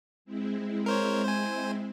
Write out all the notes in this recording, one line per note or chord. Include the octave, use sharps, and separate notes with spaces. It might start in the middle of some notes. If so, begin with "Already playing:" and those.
G#3 C4 E4
A#4 C5 C#5
C5 G#5